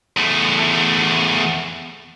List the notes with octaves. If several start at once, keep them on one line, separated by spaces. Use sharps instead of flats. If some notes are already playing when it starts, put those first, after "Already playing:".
E2 A3